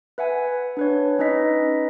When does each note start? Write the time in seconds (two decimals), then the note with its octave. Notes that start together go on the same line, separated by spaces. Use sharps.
0.18 B4 E5 F#5 G#5
0.77 D4 B4 C#5
1.19 C#4 D#4 B4 D#5 B6